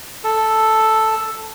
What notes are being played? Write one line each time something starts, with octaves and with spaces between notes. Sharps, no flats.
A4